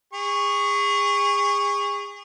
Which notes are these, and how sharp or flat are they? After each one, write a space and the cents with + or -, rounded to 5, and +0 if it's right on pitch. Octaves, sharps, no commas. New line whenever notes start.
G#4 -35 C#6 +0